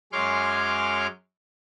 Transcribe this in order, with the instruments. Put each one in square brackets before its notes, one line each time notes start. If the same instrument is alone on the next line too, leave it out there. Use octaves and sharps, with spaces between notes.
[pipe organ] F#2 G#3 C#5 C6 D6 F6